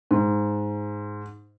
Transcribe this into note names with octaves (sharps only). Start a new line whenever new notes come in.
G#2